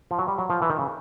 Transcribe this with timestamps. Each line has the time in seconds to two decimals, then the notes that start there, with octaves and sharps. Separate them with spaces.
0.11 F3
0.19 F#3
0.28 G3
0.38 F#3
0.50 F3
0.62 E3
0.70 D#3
0.79 C#3